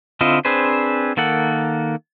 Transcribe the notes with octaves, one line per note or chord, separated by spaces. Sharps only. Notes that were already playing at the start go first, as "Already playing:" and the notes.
D3 C4 E4 F4 D#5
C4 D4 G#4 B4 C5
D#3 A#3 A4 F#5